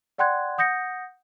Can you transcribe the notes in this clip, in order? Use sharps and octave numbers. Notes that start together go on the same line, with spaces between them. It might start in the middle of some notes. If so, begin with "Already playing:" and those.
D5 F#5 G5 C6 F#6 G#6
F#5 D#6 G6 A#6 C#7